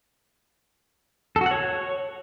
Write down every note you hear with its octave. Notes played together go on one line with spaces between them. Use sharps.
A4
F#4
F#5
C#5